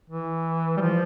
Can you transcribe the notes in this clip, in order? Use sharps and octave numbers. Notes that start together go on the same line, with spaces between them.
E3
G3
F3